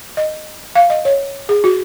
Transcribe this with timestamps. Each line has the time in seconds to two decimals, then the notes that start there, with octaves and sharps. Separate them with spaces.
0.17 D#5
0.75 F5
0.90 D#5
1.05 C#5
1.49 G#4
1.64 F#4